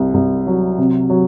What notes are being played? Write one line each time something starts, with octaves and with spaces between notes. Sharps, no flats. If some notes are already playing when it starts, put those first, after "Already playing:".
Already playing: C2
C2
F#3
C3
F#3